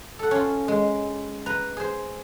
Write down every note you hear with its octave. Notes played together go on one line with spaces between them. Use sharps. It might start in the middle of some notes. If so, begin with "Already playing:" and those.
A4 F#5
C#4 F4
G#3
B4 A#5
G#4 C5